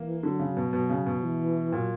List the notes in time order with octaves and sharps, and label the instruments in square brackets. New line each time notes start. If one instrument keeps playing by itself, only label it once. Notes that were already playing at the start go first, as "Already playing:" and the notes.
Already playing: [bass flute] E3 [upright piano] A#3
[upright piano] D3 [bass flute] F#3
[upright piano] C#3
B2
B2
C#3
B2
[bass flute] E3
[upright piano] A#2 [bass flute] F#3